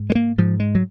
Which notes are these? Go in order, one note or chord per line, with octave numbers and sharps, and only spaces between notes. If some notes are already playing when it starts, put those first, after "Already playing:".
Already playing: G#2
G#3
A#3
G#2 F3
G#3
F#3